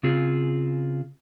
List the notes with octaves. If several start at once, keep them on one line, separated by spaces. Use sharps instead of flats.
C#3 C4 F4 G#4